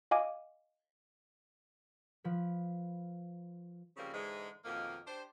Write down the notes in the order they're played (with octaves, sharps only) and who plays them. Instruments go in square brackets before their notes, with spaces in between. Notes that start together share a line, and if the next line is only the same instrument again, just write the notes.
[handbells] D#5 F5 G#5 D6
[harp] F3 B4
[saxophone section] C#3 F3 G3 A#3 C4
G#2 D3 E3 G#3
F2 B2 D#3 A#3
D4 G4 C5